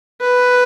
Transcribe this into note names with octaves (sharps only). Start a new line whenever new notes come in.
B4